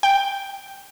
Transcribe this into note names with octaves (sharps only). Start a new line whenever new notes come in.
G5